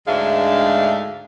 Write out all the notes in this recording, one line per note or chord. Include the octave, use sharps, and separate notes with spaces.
D2 G#2 G#3 D4 E5 F5